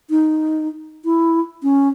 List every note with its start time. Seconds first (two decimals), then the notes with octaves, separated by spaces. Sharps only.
0.10 D#4
1.05 E4
1.63 C#4